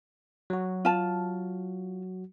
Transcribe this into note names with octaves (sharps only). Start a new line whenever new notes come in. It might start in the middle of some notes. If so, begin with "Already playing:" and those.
F#3 F#4
F4 A5